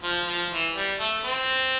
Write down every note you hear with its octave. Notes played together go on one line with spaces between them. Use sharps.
F3
F3
E3
G3
A3
C4